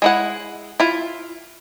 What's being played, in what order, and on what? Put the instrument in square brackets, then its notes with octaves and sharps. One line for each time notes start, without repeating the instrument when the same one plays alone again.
[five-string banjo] G#3 E4 F#5
E4 F4